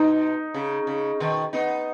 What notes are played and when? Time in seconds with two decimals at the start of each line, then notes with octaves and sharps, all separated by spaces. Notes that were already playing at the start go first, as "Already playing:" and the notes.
Already playing: B2 D#4
0.54 C#3
0.87 C#3
1.20 B2 D#3
1.53 B3 D#4